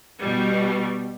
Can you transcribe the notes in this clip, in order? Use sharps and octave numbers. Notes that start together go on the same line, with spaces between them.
B2 G3